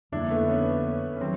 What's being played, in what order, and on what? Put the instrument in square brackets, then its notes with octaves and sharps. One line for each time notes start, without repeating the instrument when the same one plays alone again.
[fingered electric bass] F2 D3 G3 A#3 [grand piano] D4 E4
[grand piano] A3 B3
B3 C#4
C#4
[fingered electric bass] D#3 F#3 [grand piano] C4